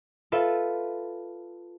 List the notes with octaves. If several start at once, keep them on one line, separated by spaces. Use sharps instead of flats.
F4 A4 B4 E5